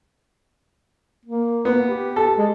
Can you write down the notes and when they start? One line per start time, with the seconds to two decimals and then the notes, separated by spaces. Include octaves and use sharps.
1.26 A#3
1.65 B3
1.87 G4
2.16 A4
2.38 G#3